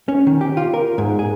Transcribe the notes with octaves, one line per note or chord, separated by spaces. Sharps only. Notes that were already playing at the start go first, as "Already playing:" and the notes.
C#4
D#3
G4
F4
A#4
G#2
G#4